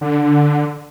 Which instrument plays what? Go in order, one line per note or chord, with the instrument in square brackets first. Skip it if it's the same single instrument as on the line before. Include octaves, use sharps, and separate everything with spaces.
[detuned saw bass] D3